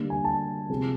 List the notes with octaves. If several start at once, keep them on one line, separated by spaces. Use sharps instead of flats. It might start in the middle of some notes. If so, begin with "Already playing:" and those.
Already playing: D3 G3 A#3
G#5
A5
C3 F3 G#3 C4